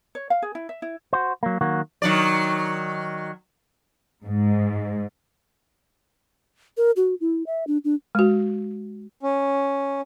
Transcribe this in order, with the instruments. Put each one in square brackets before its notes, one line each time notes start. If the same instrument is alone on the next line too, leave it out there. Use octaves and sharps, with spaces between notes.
[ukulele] C#5
F5
G#4
E4
E5
E4
[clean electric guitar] F#4 C5
F#3 A#3
D#3 F#3 A#3 F#4
[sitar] D#3 F#3 D5
[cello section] G#2
[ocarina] A#4
F#4
E4
E5
D4
D4
[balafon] G#3 F#4
[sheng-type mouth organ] C#4